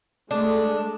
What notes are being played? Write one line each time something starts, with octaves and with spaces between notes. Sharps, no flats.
G#3 A3 D4